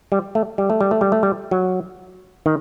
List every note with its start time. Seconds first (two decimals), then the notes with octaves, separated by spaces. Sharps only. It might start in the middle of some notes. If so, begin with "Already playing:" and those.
0.12 G3
0.35 A3
0.58 G3
0.70 A3
0.81 G3
0.91 A3
1.01 G3
1.12 A3
1.23 G3
1.51 F#3
2.46 D#3